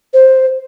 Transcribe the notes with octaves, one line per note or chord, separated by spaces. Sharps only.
C5